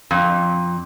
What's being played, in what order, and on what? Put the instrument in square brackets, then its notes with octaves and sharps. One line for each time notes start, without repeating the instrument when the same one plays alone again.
[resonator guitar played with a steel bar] F2